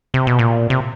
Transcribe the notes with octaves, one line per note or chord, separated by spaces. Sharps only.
C3
B2
A#2
C3